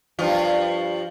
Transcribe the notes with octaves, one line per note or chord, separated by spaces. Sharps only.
G2 F3 F4